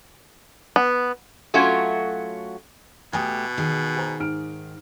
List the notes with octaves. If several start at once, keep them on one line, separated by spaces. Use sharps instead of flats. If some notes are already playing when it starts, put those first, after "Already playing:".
B3
F#3 A3 C#4 F4 F#4
B2 A3 G4 G5 G#5 D#6
D#3 G#4
C5 G#5 A#5
G#2 F6 D7